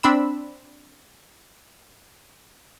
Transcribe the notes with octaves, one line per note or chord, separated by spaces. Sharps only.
C4 D4 B5 E6